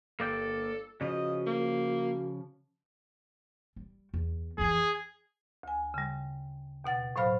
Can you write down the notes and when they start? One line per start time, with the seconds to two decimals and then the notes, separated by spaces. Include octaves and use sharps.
0.20 G1 A#3 A4 D5 G5
1.01 C#3 F3 F#4 D#5
1.46 A#3
3.76 G3
4.14 E2
4.58 F2 E3 G#4
5.63 D2 G#5
5.94 C#3 G3
6.84 D#2 B2 F#5 A6
7.16 A2 F#3 C5 F5 B5 F6